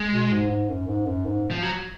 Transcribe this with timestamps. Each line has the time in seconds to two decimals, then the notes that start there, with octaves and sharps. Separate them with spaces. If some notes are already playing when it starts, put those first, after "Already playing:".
Already playing: G#3
0.12 B2
0.31 G#2
0.50 G#2
0.69 F#2
0.87 G#2
1.06 F#2
1.25 G#2
1.51 F3
1.62 F#3